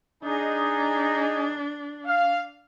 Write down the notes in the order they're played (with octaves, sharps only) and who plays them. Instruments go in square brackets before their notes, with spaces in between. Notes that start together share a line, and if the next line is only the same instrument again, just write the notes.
[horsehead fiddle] D4 [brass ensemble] D#4 G#4
[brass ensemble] F5